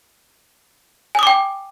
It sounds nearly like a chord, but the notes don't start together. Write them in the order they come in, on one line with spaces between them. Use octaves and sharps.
G#5 D#6 D6 G5